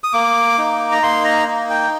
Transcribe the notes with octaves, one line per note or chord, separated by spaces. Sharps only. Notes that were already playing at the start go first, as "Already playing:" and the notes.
D#6
A#3 D6
D#4
A#5
A#3 C6
A#5
D#4
G5